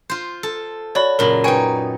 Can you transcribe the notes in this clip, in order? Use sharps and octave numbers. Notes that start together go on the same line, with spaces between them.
F4 C5
A4
F#4 C#5 D5 B5
F#2 A#2 C#3 A#4 B5
D#4 B4 C#5 G5 G#5